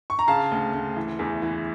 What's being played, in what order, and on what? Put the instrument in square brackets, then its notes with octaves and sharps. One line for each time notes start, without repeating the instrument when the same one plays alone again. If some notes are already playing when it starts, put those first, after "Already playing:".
[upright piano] C#6
A#5
C#3 F5 A5
D2
D2
E3
E2
E3